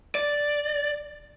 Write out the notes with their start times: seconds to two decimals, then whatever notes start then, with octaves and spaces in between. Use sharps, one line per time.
0.15 D5